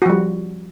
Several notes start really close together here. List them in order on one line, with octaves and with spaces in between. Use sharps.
F#4 F3 G3